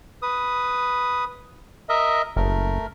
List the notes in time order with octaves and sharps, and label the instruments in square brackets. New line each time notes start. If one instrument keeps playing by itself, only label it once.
[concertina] B4 D#6
A#4 D#5 E5
[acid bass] F#1 [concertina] A3 A#4